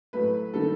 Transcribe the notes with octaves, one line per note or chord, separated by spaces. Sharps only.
A2 F#3 A3 B4
D#3 G3 A4